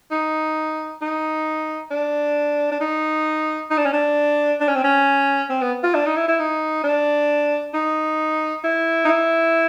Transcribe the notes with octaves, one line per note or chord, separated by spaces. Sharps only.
D#4
D#4
D4
D4
D#4
D#4
D4
C#4
D4
D4
C#4
C4
C#4
C4
B3
F4
D4
D#4
E4
E4
D#4
D4
D#4
E4
D#4
E4